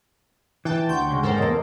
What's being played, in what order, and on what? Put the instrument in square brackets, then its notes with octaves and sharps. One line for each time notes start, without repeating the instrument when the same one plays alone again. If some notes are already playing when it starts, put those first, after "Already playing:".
[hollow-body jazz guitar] E3 [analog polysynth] G5 A5
[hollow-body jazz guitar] D2 [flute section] F#5 C6 C#6 [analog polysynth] G5 G6
[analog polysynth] C#3 G#3
[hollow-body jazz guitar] C#2 G#2 [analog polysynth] A4 A#4 C5 [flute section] F#5 G5
[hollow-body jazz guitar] E2 A#3 [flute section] C#5 D#5 D#6